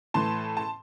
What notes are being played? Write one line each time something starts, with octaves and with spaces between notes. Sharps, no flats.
A2 E3 A5 C6
A5